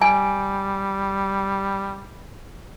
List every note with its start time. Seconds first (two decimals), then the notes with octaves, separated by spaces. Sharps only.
0.02 G3 G#5